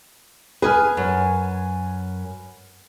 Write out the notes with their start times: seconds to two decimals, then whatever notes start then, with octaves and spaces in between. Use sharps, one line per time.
0.62 G#4 B4 G#5 F6
0.97 F#2